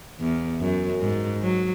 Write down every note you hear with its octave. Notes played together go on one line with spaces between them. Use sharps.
E2
F#2
G#2
F#3